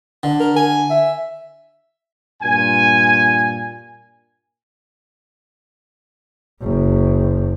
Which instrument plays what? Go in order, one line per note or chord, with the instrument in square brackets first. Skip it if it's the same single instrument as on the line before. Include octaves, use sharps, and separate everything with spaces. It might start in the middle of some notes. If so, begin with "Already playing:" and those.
[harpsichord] D3
[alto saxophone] A#4
G#5
E5
[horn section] G2 A#2 G#5
[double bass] F#1